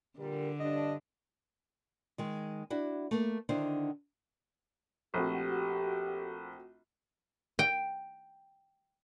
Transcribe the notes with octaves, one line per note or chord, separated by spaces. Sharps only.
A#2 D3 G3 A#4
G2 D4 D#5
D#3 G#3
D4 E4 F#4
A3 A#3
D3 D#3 D4 E4 C5
A#1 A3 C4 F#4 G4
G5